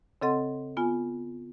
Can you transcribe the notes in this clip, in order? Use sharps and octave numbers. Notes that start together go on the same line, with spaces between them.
C#3 C4 A4 D#5 F#5 C6
B3 F4 G#5